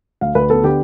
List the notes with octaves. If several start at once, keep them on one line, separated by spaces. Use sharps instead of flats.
D2 F5
D2 B4
B3 A4
D3 G4